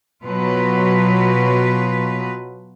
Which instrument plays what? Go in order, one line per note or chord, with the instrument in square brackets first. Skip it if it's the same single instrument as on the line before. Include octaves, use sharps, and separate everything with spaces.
[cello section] B2 F#3 F4 B4